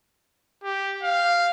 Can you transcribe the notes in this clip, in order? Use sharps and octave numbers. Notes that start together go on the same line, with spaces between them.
G4
F5